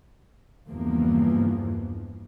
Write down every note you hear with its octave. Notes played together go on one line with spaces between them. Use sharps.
E2 G2 C#3 E3 F3 A#3